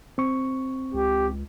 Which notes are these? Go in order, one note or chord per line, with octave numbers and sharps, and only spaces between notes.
C4 C#6
C#2 G4